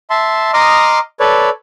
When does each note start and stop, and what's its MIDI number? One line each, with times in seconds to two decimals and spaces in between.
0.10 0.51 76
0.10 0.51 81
0.10 0.51 84
0.54 0.99 75
0.54 0.99 82
0.54 0.99 84
0.54 0.99 86
0.54 0.99 87
0.54 0.99 89
1.20 1.49 69
1.20 1.49 71
1.20 1.49 73
1.20 1.49 74